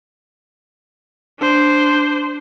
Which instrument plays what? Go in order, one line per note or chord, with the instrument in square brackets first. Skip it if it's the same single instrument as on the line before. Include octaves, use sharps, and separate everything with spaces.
[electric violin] D4 C5